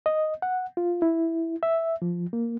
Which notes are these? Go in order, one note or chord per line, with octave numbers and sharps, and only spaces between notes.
D#5
F#5
F4
E4
E5
F3
A#3